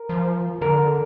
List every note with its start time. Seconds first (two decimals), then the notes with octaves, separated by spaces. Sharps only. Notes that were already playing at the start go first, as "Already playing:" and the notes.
Already playing: A#4
0.09 F3
0.61 D3 A#4